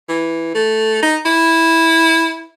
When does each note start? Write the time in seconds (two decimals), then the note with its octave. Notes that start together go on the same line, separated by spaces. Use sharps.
0.08 E3
0.54 A3
1.02 D#4
1.25 E4